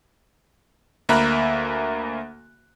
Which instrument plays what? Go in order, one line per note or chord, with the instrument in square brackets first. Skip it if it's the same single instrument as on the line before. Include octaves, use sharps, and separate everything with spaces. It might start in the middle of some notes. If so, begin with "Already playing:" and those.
[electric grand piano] D2 A#3 E5 A#5 B5 F#6